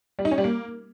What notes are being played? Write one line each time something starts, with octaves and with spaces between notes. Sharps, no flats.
G3
D#4
C#4
G3
A#3